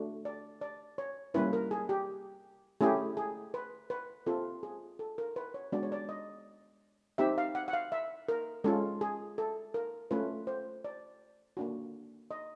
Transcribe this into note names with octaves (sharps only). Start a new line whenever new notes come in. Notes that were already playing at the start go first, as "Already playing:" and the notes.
Already playing: A3 D4 F#4
D5
D5
C#5
G3 A#3 C#4 E4 B4
A#4
G#4
G4
A3 C#4 E4 G4 G#4
G#4
B4
B4
C4 F4 A4
G#4
A4
A#4
B4
C#5
G#3 B3 D4 F#4 D5
C#5
D5
D#5
C4 D#4 G4 E5
F5
F#5
F#5
F5
E5
A#4
G#3 C#4 F4 A4
G#4
A4
A#4
A3 C#4 F4 B4
C5
D5
A#3 D4 F#4
D#5